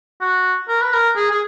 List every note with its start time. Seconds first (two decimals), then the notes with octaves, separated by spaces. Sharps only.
0.21 F#4
0.69 A#4
0.81 B4
0.93 A#4
1.16 G#4
1.31 G#4